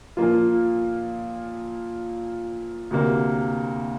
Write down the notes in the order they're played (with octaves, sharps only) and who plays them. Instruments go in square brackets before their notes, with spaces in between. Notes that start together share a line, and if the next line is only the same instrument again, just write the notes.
[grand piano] A#2 F3 A#3 F4
D2 C3 A#3